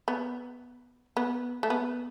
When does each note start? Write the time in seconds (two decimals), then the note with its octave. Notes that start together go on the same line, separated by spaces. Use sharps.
0.08 B3
1.17 B3
1.63 A3
1.70 B3